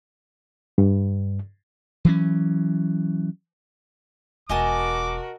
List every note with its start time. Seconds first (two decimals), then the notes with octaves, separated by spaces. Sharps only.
0.78 G2
2.05 E3 F#3 C#4
4.49 E1 F#4 A#4 D#5 G#5 A5 D6